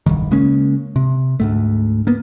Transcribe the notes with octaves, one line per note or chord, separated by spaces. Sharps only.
D1 B1 G2 D#3
C#3 G#3 A#3 C#4
C3
D2 G#2 A3
A#3 B3